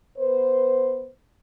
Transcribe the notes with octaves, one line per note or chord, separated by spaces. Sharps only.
B3 B4 C5